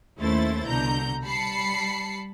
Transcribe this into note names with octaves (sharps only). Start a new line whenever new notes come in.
D#2 A3 C#4 E4 C5 A6
C2 B2 D3 A#5 G6
G3 A5 B5 C7 C#7